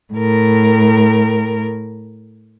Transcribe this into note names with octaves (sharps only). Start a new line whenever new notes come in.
A2 A#4